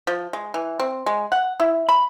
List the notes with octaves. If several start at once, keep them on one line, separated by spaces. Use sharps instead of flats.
F3
G#3
E3
C4
G#3
F#5
E4
B5